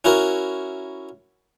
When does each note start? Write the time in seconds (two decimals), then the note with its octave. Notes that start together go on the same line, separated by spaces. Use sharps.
0.05 C#4 E4 F#4 A#4